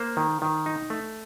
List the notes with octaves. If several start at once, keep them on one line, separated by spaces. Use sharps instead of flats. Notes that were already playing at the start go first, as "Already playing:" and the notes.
Already playing: A#3 C5
D#3
D#3
D#4
A3